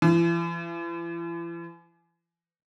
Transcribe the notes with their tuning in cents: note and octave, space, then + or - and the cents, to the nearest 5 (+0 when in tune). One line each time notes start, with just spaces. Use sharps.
E3 +40